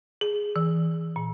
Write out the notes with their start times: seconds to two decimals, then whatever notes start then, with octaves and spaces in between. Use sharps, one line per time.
0.21 G#4
0.56 E3
1.16 A#2